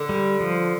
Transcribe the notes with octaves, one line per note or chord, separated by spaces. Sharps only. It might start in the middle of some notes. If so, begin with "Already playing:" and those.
Already playing: D3
G3
F3